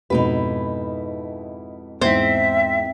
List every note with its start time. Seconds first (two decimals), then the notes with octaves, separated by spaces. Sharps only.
0.10 F2 G#2 B2 D#4 E4 B4
2.02 E2 G#2 C4 E5